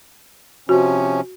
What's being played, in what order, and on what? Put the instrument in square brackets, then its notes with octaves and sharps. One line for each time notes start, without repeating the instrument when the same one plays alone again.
[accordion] C3 F3 C#4 [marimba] F#4